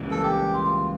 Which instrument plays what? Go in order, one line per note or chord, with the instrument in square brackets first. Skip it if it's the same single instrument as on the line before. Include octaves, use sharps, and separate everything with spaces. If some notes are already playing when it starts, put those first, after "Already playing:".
Already playing: [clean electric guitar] C#2 C#3 E3 G3 A#3
[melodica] A4
G4
F4